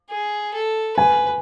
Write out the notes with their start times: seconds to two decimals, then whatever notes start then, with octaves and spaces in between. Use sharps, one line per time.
0.10 G#4
0.54 A4
0.97 B4 G#5